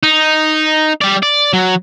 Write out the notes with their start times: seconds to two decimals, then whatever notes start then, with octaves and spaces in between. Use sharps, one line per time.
0.03 D#4
1.01 G3 D5
1.23 D5
1.53 F#3